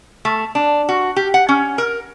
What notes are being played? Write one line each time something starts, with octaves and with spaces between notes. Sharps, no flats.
A3
D4
F#4
G4
F#5
C#4
A#4